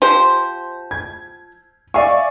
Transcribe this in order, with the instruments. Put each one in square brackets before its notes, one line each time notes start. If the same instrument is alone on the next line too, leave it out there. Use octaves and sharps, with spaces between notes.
[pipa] F3 C5 [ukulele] G4
[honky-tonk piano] G#6
[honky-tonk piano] D5 E5 C#6 [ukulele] F5 G#5